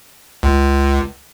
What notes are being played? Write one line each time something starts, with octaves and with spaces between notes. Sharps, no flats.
C#2